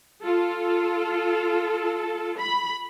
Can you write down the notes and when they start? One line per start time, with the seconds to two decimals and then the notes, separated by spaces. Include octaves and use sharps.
0.23 F4 A4
2.38 B5